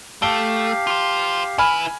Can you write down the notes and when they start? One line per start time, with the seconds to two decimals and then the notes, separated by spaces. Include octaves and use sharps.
0.22 A3 G4 F5 A5 D7 G7
0.87 F4 C5
1.58 E4 B4 G#5 B5 F6